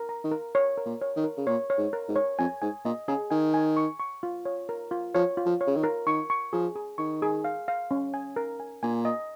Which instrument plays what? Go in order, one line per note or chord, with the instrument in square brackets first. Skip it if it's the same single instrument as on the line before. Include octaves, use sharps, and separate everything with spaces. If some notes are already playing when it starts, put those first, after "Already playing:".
Already playing: [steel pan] A#4
A#5
[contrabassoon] D#3
[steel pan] A#4
C#5
A#4
[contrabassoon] A#2
[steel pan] C#5
[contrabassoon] D#3
[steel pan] A#4
[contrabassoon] C#3
[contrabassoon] A#2 [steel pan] C#5
[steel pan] C#5
[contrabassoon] G#2
[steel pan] A#4
[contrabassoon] G#2
[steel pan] C#5
[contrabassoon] F2 [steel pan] G#5
[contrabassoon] G#2 [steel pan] G#5
[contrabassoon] A#2 [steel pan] D#5
[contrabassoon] C#3 [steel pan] G#4
[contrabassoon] D#3 [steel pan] G#5
[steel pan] G#5
C#6
C#6
F4
C#5
A#4
F4
[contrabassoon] F3 [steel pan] C#5
[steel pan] F4
[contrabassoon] F3
[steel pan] C#5
[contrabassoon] C#3
D#3
[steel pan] A#4
[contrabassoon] D#3 [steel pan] C#6
[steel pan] C#6
[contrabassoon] F3 [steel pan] G#4
[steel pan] G#4
[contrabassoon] D#3 [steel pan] C#6
[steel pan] G#4
F5
F5
C#4
G#5
A#4
G#5
[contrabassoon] A#2 [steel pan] G#5
[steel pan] D#5